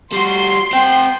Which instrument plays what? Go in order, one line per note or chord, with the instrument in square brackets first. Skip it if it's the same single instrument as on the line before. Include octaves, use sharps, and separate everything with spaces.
[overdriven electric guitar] G3 F#4 [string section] C6
[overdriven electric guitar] C4 F#5 [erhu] G5